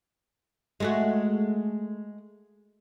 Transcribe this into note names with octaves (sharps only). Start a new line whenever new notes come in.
G#3 A3 F#4